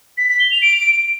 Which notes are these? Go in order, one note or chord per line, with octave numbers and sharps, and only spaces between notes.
B6
B6
G7
F7
D7